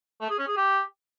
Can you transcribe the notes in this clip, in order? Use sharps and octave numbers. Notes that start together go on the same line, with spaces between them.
A3
G#4
C#4
G#4
G4